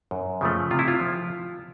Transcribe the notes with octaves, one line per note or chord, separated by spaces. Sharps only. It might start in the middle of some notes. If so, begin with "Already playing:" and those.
F#2
C#3 F3 A3
C3 F4
E4
F4
F3